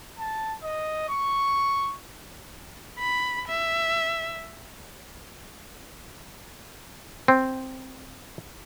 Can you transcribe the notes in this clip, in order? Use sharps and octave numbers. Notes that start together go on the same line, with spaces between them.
A5
D#5
C#6
B5
E5
C4